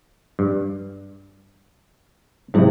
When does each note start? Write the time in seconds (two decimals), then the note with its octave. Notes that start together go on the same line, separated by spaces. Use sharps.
0.39 G2
2.54 G#2 C3 F#3 E4 G#4